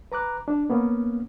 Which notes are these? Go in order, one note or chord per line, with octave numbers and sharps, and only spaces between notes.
B4 A#5 D6 F#6
D4
A#3 B3 C#4